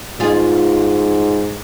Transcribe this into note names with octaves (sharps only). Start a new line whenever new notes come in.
G#2 F4 G#4